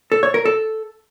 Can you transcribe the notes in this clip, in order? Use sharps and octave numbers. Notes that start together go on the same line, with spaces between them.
A4
C#5
A#4
A4